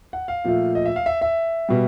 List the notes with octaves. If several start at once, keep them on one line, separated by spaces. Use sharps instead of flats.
F#5
F5
A#2 F3 A3
D#5
E5
F5
E5
E5
B2 G3